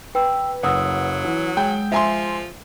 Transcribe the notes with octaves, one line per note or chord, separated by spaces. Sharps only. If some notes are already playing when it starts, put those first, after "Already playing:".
B4 G5 E6
F#1 F#3 F#5 D#6 E6
E3
G#3 G5
F3 E5 G#5 C6